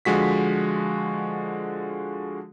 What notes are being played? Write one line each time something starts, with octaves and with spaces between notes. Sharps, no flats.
D3 F3 G#3 F#4 B6